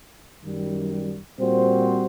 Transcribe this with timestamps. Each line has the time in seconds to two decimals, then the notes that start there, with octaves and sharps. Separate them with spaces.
0.43 F#2 D#3 G3
1.39 A#2 G3 C4 F#4 C5